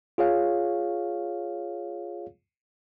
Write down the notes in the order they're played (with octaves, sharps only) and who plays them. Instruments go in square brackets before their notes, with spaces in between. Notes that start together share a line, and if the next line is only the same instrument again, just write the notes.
[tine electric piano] F4 G#4 C#5 F5